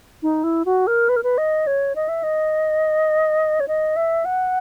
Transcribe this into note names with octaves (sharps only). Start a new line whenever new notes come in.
D#4
E4
F#4
A#4
B4
A#4
B4
D#5
C#5
D#5
E5
D#5
C#5
D#5
E5
F#5